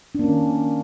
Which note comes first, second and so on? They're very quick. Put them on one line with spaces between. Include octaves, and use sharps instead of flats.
D4 A#3 C#4 D#3